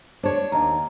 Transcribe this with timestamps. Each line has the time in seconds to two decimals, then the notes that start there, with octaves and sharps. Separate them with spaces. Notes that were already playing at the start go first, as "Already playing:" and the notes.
0.23 D4 C5 C#5
0.52 D#2 D#5 A#5